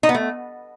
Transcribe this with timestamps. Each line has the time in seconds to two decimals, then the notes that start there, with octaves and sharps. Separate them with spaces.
0.03 D#4
0.09 B3
0.14 A3